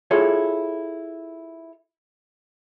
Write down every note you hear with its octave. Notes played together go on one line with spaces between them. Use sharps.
E4 F4 G#4 A4 C#5